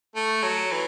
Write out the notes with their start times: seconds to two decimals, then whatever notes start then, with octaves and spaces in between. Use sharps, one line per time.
0.16 A3
0.43 F#3
0.72 E3